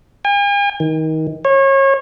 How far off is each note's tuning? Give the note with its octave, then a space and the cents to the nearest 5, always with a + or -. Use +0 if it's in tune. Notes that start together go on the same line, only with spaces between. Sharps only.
G#5 -45
D#3 +25
C#5 -30